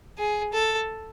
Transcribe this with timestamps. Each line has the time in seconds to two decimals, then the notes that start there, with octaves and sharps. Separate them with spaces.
0.18 G#4
0.53 A4